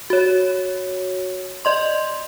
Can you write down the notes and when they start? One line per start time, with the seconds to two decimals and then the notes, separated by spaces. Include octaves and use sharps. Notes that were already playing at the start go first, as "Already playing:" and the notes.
0.10 F#4 C#5
1.65 D5 D#5 C6